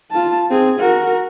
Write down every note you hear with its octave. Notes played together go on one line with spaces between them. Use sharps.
F4 A5
C4 G#4
F#4 A#4